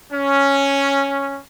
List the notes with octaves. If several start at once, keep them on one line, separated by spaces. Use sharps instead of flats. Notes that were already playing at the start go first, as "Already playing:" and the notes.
C#4